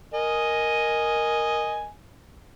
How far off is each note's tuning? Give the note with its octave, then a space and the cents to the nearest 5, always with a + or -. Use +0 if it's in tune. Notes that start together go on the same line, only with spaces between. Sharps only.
A#4 +0 D#5 +0 G#5 +0